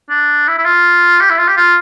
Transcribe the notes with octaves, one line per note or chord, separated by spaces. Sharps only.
D4
E4
E4
F4
G4
E4
F4
G4
F4